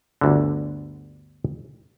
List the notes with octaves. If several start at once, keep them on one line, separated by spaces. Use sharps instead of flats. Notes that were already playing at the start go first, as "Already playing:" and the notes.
G1 D2 D3